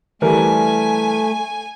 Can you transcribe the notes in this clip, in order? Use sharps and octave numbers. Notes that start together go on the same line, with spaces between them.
E3 G3 A3 A#4 G#5